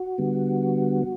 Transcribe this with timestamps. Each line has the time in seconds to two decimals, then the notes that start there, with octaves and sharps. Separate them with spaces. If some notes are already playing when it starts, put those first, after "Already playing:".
Already playing: F#4
0.18 D3 G3 B3